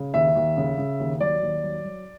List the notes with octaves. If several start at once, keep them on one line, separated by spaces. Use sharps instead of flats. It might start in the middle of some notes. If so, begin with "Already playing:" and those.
Already playing: C#3
D#2 E5
D#2
C#3
C#3
D#2
F#3 D5
D#2
F#3
F#3